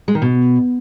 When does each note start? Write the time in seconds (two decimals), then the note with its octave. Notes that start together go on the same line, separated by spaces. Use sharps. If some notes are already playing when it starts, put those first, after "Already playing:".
0.08 G#3
0.15 D#3
0.22 B2